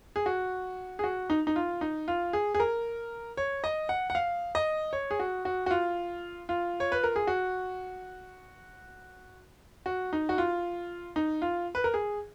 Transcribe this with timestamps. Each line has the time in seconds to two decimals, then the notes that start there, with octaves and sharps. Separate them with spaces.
0.16 G#4
0.26 F#4
0.99 G#4
1.04 F#4
1.30 D#4
1.47 D#4
1.56 F4
1.81 D#4
2.08 F4
2.33 G#4
2.55 G#4
2.60 A#4
3.37 C#5
3.64 D#5
3.89 F#5
4.10 F#5
4.15 F5
4.55 D#5
4.93 C#5
5.11 G#4
5.20 F#4
5.45 F#4
5.66 F#4
5.71 F4
6.49 F4
6.80 C#5
6.92 B4
7.04 A#4
7.16 G#4
7.27 F#4
9.86 F#4
10.13 D#4
10.29 F#4
10.38 F4
11.16 D#4
11.42 F4
11.75 B4
11.84 A#4
11.94 G#4